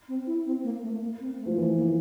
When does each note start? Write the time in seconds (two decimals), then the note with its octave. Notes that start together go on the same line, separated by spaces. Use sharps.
0.08 C4
0.27 E4
0.46 C4
0.64 A#3
0.82 A3
1.02 A#3
1.20 C4
1.39 A3
1.46 F3
1.57 E3 A3
1.76 A#3